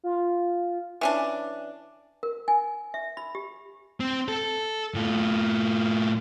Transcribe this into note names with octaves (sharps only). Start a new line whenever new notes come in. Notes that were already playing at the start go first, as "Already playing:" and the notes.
F4
E3 C#4 D4
A#4
G#5
E5
B5
G4
C4
A4
A2 F4